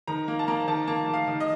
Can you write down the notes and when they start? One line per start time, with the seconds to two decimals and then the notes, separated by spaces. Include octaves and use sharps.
0.07 D#3 A#5
0.28 A#3
0.39 A5
0.48 A#3 A#5
0.68 D#3 A5
0.87 A#3 A5
1.08 A#3
1.13 F5
1.28 D#3
1.40 D#5